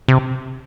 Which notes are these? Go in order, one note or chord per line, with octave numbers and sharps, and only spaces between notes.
C3